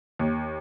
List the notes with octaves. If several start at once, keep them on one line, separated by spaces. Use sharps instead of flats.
D#2